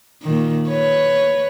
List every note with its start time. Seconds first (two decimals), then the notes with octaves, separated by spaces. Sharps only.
0.23 A#2 D#3
0.68 B4 C#5